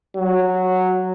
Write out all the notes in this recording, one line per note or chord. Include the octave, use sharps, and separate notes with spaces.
F#3